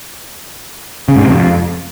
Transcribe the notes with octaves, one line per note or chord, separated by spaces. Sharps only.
C#3
G#2
C3
F2